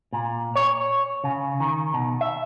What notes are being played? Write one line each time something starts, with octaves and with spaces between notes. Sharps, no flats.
A#2
C#5
C#3
D#3
B2
E5